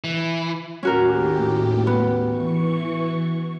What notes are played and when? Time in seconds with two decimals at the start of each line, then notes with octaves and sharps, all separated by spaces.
0.04 E3
0.83 D#2 A2 C#4 F#4 G4 A#4
1.87 B3
2.28 E3 C#6